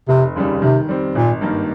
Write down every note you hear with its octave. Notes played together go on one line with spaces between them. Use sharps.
F1 C3
D#2 C#3 G3
C3 D#3
G3 C4
G#1 A#2
G2 D#3 A#3